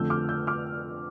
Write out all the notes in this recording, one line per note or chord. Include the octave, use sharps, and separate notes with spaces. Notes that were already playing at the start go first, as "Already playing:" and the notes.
Already playing: F2 D3 A3 E6 G6
D6 F6
E6 G6
D6 F6